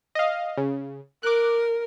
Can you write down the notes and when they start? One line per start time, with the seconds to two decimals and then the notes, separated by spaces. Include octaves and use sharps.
0.15 D#5 F5
0.57 C#3
1.23 A#4 D6 F#6